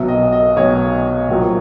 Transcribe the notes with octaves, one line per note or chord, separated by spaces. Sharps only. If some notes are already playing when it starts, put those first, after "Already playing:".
Already playing: B1 B2 F#3 E5
D#5
D#5
B1 B2 F#3 C#5
A#1 A#2 F#3